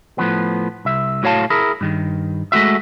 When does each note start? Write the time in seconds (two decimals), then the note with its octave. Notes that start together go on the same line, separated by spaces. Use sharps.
0.18 A2 F3 B3
0.85 C2 E5
1.23 A2 F#4 C#5 F5 A5
1.50 E4 G#4 A#4
1.81 G2 D#3
2.52 G#3 A3 F#4 E5